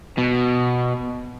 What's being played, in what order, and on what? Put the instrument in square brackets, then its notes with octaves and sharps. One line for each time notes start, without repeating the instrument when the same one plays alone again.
[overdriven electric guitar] B2